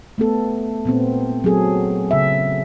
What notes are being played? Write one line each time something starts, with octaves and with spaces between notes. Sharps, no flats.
A3 B3 A4
A#2 B3 C4
F#3 C4 G#4 A4
C#3 E5